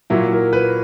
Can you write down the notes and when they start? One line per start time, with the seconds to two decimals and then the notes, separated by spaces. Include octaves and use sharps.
0.10 A#2 F#3 E4
0.31 A#4
0.53 B4